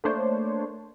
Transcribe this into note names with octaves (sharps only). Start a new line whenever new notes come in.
A3 A#3 D4 C5 C#5